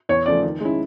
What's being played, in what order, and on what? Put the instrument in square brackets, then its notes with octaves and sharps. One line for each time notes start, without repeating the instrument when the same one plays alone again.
[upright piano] E2 [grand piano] C#5
[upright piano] C#3 F3 A3 [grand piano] D5
[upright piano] D#3
G#3 C#4 E4